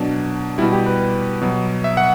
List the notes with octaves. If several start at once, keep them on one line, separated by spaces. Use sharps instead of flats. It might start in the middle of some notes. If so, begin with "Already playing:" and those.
Already playing: B2 F#3 D4
B2 G3 E4
G4
B4
B2 F#3
E5
F#5